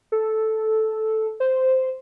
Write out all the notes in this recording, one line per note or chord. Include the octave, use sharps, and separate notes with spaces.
A4
C5